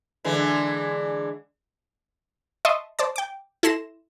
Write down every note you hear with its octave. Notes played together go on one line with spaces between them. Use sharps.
D3 E3 G#3
D#5 E5 A5 C6 C#6 D#6
C5 D5 A5
G5 D6
E4 A4 C6 A#6 E7